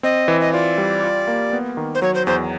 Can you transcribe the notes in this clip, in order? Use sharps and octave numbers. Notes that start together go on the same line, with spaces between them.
C4 D#5
E3
D#5
F4 D5
G3
F4
A#3
B3
D#3
C5
F#3 C#5
C5
E2 C5